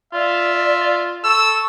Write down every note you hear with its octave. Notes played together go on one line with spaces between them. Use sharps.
F4 D5 E5
A4 C#6 E6